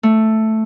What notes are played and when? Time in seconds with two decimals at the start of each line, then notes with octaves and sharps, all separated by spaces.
0.03 A3